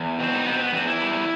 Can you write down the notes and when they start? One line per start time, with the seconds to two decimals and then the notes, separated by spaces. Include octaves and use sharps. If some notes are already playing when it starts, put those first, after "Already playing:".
Already playing: E2
0.19 B2 C4
0.35 D#4
0.46 B3 C4
0.60 B3
0.73 E2 C4
0.87 E4
1.00 G3